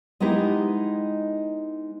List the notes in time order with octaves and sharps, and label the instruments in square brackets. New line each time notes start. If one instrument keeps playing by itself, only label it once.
[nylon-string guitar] G#3 B3 D#4 E4 G4